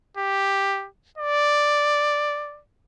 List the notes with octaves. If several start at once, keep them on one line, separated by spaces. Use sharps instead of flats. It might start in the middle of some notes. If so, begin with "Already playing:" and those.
G4
D5